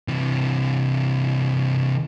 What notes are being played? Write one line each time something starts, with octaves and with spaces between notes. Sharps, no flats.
C3 E3